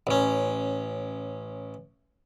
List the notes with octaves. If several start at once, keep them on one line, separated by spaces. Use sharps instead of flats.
A1 C#4